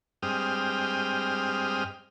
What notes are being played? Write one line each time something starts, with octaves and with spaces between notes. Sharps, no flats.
G2 G#3 C4 G5 D#6 F6